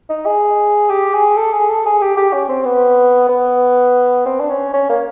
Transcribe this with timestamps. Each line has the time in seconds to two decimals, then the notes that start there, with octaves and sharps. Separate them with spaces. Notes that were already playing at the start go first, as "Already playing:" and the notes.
0.09 D#4
0.26 G#4
0.89 G4
1.14 G#4
1.37 A4
1.53 G#4
1.70 A4
1.86 G#4
2.01 G4
2.17 G4
2.33 C#4
2.49 C4
2.65 B3
3.29 B3
4.26 C4
4.40 D4
4.50 C#4
4.73 C#4
4.89 A#3